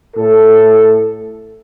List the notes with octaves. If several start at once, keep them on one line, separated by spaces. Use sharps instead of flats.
A2 A4